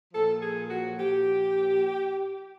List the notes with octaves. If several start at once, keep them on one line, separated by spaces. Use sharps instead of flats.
A#2 F3 A4
G#4
F#4
A#2 F3 G4